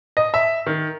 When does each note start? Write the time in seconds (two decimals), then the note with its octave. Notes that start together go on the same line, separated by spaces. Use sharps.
0.17 D#5
0.34 E5
0.67 D#3